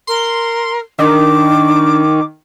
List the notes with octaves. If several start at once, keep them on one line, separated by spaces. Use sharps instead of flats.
A#4 C6
D#3 D4 D6